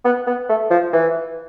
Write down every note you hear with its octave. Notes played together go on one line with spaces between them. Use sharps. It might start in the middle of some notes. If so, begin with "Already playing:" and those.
B3
B3
A3
F3
E3